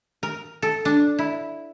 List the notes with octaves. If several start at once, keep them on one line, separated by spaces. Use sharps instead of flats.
A#4
A4
D4
E4